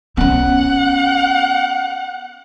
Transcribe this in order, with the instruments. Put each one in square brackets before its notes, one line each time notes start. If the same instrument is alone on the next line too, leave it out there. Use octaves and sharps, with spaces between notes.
[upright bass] B3 C#4 [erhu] F#5